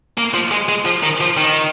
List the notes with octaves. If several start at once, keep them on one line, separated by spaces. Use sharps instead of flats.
A#3
F3
G#3
G#3
F3
D#3
F3
D#3